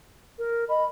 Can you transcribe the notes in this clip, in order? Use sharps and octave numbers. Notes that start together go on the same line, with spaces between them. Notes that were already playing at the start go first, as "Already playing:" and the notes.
A#4
D#5 B5